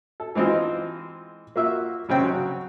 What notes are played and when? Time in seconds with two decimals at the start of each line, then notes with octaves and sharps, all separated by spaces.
0.20 A4
0.35 E3 G#3 C4 D#4 F4
1.56 A#3 F4 F#4 E5
2.08 F#2 C#3 C4 G5
2.24 F#3 F#4